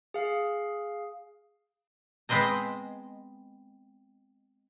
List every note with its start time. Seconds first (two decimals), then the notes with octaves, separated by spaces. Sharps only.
0.14 G#4 F5
2.29 G#3 B3 C4 D#5 A#5